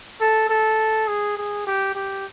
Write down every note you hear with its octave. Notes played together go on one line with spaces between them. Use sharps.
A4
A4
G#4
G#4
G4
G4